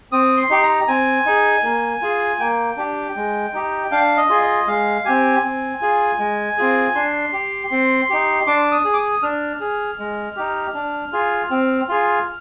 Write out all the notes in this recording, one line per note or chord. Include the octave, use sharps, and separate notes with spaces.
C4 D#6
C6
D#4 G4
A#5
C4 G#5
D#4 G#4
A#3
F4 G#4
A#3 G5
D4 G4
G#3
D#4 G4
D4 F5
D#5
F4 G#4
D#5
G#3 F5
C4 G4 G#5
C4
F4 G#4
G#3
C4 F4 G#4
D4 C6
G4
C4
D#4 G4
D4 D6
D#6
G#4
D6
D#6
D4 F6
G#4
G#3
D#4 G4
D4
F4 G#4
C4
F4 G#4